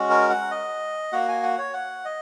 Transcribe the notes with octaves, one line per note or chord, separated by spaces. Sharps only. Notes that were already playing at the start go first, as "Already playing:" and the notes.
Already playing: G#3 C#4 F#4
A#4
F#5
D#5
A#3 F#4 F#5
G#5
F#5
C#5
F#5
D#5